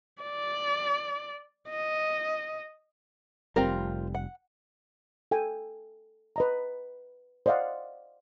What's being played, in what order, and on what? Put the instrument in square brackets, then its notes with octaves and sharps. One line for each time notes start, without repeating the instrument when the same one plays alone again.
[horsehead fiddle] D5
D#5
[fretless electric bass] F1 C2 G3 [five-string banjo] C4 F4 A#4
[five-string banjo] F#5
[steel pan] A4 G5 G#5
B4 D#5 A#5
C5 D5 D#5 F5 F#5 C6